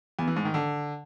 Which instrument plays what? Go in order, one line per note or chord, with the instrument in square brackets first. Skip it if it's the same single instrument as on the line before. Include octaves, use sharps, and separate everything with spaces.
[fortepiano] E2
E3
G#2
D#3
D3